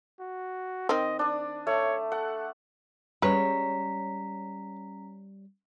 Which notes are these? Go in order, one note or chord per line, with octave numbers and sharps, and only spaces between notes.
F#4
D#3 C4 D#5
D4 D5 D#6
A3 C#5
A4 F#5
C#3 G3 G#3 C#4 B4 C#5 A#5 B6